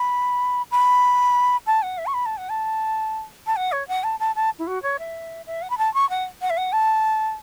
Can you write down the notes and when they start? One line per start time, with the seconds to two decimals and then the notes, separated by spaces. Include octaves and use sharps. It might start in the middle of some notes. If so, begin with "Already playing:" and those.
Already playing: B5
0.71 B5
1.67 A5
1.82 F#5
1.98 E5
2.06 C#6
2.14 B5
2.26 A5
2.37 F#5
2.49 A5
3.47 A5
3.56 F#5
3.72 C#5
3.88 F#5
4.04 A5
4.20 A5
4.36 A5
4.59 E4
4.67 F#4
4.83 C#5
4.99 E5
5.46 E5
5.62 F#5
5.70 B5
5.78 A5
5.94 C#6
6.10 F#5
6.41 F#5
6.50 E5
6.57 F#5
6.73 A5